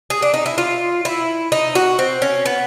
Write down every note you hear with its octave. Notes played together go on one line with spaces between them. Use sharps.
G#4
D4
D#4
E4
F4
E4
D#4
F#4
C4
C#4
B3